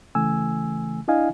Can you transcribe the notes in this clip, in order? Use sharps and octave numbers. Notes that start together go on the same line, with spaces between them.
C#3 E3 A3 G#5 E6
D4 E4 D#5 F5 G#5